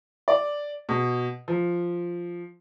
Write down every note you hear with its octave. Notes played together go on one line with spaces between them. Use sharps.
D5
B2
F3